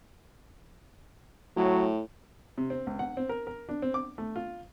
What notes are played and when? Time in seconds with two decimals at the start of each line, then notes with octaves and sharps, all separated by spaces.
1.57 A2 F#3
2.58 C3
2.70 C4
2.87 C#2
2.99 F#5
3.17 C4
3.29 A#4
3.47 A#4
3.69 D4
3.82 C4
3.94 D6
4.18 A3
4.36 F4